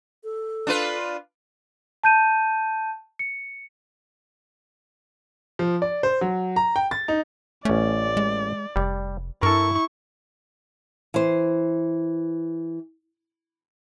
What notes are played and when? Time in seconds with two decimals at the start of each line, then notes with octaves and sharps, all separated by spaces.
0.24 A4
0.67 D4 F4 B4
2.04 A5 G6 D#7
3.19 C#7
5.59 F3
5.82 D5
6.03 C5
6.21 F#3
6.56 A#5
6.76 G5
6.91 A6
7.08 D#4
7.65 A1 A3 C#4 D5
8.17 G#3
8.76 F1 G3
9.43 G2 E4 A4 A#4 C#6
11.14 E3 C5